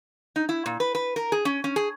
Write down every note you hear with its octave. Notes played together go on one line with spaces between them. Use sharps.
D#4
E4
A#2
B4
B4
A#4
G#4
C#4
C#4
G#4